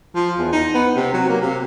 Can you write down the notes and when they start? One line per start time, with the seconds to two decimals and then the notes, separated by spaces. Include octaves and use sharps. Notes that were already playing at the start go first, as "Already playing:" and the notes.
0.15 F3
0.39 E2
0.52 D#4
0.74 B3
0.96 C3
1.14 F#3
1.29 A#3
1.42 C3